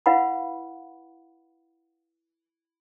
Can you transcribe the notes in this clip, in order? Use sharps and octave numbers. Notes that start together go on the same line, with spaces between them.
E4 B4 F5 F#5 B5